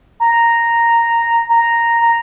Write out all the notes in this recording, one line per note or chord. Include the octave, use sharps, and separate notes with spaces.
A#5
A#5
A#5